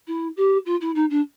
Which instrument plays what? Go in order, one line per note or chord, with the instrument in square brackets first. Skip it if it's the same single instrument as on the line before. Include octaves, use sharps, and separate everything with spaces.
[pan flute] E4
G4
F4
E4
D#4
D4